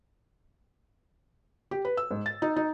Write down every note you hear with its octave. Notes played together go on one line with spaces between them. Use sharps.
G4
B4
E6
G#2
A6
D#4
D#4